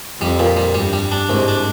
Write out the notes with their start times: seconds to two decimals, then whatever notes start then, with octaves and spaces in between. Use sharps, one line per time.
0.20 F2 G3
0.39 A#2
0.57 G3
0.74 G2 G3
0.93 G3
1.12 D4
1.29 C2 G#2
1.48 D4